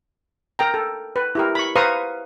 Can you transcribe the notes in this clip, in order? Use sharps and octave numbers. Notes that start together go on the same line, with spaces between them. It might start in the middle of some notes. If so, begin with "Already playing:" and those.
A#4 G5 A#5
A4
B4
E4 G4 A#4
B5 C#6
B4 C5 F5 A#5 C#6 D#6